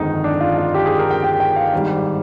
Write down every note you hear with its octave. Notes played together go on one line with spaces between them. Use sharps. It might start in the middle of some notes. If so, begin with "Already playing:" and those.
Already playing: G1 F2 D#3 G#3 D#4
D4
F4
F4
G4
G#4
A#4
G5
G5
G5
F5
G#1 G#2 G3